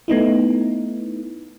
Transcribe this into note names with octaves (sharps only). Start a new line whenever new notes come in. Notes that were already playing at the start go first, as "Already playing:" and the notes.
A3 B3 D#4 E4